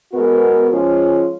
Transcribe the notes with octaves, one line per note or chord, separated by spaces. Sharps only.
B2 G#3 B3 F#4 A#4
F3 G#3 C#4 F4